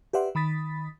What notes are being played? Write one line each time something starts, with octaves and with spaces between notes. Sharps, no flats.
G4 B4 D5 E5 F#5 C6
D#3 B5 D#6 A6 B6